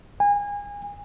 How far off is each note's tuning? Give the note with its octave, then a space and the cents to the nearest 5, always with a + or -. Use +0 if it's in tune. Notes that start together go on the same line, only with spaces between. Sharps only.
G#5 -30